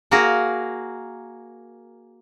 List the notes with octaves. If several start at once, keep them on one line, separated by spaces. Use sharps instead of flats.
A#3 F#4 G#4 A#4